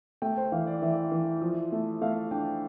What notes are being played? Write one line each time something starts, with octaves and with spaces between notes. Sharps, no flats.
A3 G5
C5
E3 F5
D5
E3 E5
E3
F3
A3
A3 F5
D4 G5